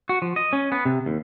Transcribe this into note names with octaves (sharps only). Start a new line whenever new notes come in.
F#4
F3
D#5
C#4
B3
C3
D#2